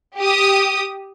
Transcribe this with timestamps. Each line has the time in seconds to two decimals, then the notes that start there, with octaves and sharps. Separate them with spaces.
0.18 G4 D#6